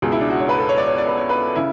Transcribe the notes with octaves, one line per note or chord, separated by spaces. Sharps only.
C#2 B2 G#4
E4
D4
F#4
C#5
B4
A4
C#5
D5
C#5
D5
B4
C#5
B4
C#3 E4